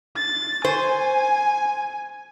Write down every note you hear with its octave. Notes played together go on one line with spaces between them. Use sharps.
A6
C5 G#5